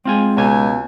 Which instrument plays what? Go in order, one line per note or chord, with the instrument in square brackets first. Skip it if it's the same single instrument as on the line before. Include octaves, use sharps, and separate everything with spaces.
[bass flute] G#3 [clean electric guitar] C4 F4 G#5
[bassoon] C#2 [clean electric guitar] B2 G#5